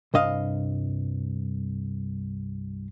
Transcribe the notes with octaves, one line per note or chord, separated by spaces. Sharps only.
C2 G2 D#5 F5